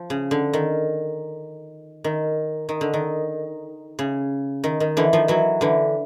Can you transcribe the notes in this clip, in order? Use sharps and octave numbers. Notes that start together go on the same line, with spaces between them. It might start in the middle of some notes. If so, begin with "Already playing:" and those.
Already playing: F3
C#3
D3
D#3
D#3
D#3
D3
D#3
C#3
D#3
D#3
D3 E3
D#3 F3
E3 F#3
D3 E3